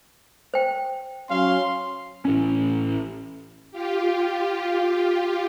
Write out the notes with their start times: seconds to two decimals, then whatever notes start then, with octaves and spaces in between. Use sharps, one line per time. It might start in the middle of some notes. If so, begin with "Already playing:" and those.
0.54 C5 G5
1.30 F#3 C#4 F5 C6
2.25 A1 C#4
3.71 F4 G4